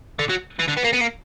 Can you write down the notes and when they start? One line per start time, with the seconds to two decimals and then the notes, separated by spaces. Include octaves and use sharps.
0.19 D3
0.29 F#3
0.59 E3
0.68 D3
0.77 B3
0.84 A#3
0.93 B3
1.00 A#3